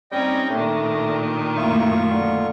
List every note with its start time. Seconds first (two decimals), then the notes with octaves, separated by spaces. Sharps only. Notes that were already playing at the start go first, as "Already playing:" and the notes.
0.12 G3 C4 C#4 D#4 D#5 G5
0.50 A#2 D#3 A3 D4
1.57 F#2 A3 A#3 E4 F4 C#6
2.11 D3